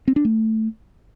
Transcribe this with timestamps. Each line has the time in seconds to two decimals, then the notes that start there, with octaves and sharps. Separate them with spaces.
0.08 C4
0.16 D4
0.25 A3